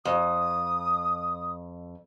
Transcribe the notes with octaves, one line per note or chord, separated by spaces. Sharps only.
F2 D#6